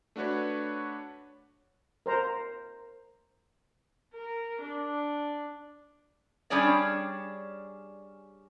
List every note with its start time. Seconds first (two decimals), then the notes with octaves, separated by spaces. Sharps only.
0.16 A3 D4 F#4 B4 C#5
2.06 A#4 C5 A#5
4.14 A#4
4.61 D4
6.50 G3 C#4 D4 G#4 C#5 D5